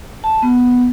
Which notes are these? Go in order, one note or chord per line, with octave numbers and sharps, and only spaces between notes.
A5
B3